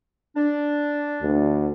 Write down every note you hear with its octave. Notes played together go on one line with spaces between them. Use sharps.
D4
D2